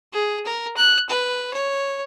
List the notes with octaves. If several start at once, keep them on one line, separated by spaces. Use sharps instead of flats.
G#4
A#4
F#6
B4
C#5